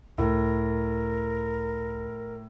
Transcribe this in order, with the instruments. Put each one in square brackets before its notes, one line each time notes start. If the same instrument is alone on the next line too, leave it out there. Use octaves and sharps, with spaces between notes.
[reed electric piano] C#2 [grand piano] A2 [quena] A#4